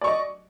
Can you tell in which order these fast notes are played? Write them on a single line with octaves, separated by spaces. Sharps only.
D5 C#6 D#5